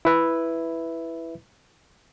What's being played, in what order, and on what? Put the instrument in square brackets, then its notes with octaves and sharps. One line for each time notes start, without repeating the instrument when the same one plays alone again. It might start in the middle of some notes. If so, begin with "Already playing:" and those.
[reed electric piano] E4 B4 E5